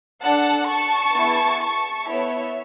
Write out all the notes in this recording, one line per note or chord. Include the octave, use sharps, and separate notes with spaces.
D4 A4 F#5 A5
A5 C#6
B3 E4 G#4
A5 C#6
B3 E4 A4 C#5 E5